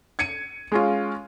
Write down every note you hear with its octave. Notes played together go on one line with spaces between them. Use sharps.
G#6 C#7 D#7
G#3 C#4 F4